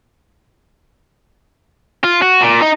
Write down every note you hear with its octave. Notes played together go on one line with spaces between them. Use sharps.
F4
F#4
A#2
D#4